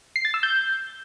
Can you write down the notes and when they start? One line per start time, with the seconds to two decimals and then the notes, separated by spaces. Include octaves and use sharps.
0.16 C7
0.25 A6
0.34 E6
0.43 G6